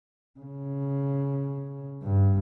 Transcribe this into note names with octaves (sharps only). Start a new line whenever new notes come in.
C#3
G2